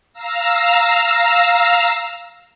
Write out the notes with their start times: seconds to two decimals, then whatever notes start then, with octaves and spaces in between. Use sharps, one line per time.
0.13 F5 A#5 E6